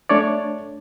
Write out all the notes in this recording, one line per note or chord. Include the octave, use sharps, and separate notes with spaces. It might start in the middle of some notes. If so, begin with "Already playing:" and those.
A3 D4 C#5 D5